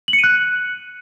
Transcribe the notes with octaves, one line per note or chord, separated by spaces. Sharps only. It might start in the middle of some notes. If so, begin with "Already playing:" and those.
F#7
C#7
D#7
F#6